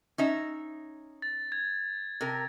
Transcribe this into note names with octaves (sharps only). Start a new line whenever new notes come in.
C#4 D#4 E5
A6
G#6
C3 A#4